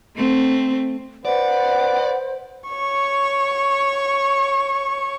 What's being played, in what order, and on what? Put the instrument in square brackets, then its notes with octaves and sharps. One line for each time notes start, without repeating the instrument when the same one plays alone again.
[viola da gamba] A3 C4
[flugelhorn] B4 [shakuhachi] C5 [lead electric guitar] D5 [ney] F#5
[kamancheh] C#5 C#6